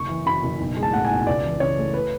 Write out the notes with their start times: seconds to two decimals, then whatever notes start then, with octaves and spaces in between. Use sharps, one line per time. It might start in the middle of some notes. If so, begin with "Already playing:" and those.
Already playing: F#1 C#6
0.09 E3
0.26 F#2 B5
0.43 F#1
0.60 B1
0.77 G#3
0.83 A5
0.93 A2 F#5
1.05 G#5
1.10 B1
1.27 C#2 D5
1.44 E3
1.60 C#3 C#5
1.78 A3
1.94 B4